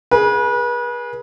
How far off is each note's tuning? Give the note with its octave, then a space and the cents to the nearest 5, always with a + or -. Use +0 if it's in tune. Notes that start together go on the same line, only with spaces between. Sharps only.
G#4 +5 B4 -35